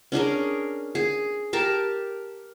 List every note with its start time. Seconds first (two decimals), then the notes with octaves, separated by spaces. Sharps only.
0.12 C#4 D4 G#4 A#4
0.95 G#4
1.53 G4 A#4 A5